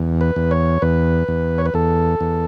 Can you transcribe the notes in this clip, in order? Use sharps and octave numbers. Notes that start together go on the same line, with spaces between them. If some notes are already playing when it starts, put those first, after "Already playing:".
Already playing: E2
B4
E2
C#5
E2 B4
E2
C#5
B4
E2 A4
E2